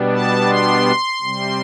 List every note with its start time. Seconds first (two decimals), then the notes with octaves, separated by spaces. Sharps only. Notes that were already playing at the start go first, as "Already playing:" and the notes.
Already playing: B2 G3 B3 D4
0.12 A5
0.49 C6
1.22 C3 G3 C4